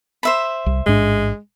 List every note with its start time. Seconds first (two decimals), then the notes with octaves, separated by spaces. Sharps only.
0.23 C5 E5 B5
0.66 C2
0.86 A1 G#2 G#3 D4